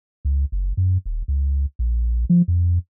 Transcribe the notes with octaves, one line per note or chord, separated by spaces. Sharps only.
C#2
F#1
F#2
D#1
C#2
A#1
F3
F2